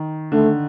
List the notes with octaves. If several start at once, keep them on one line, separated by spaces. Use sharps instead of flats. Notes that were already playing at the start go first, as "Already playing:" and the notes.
Already playing: D#3
D3 A3